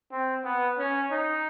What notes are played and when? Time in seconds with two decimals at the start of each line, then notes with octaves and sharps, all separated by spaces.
0.11 C4
0.44 B3
0.78 C#4
1.11 D#4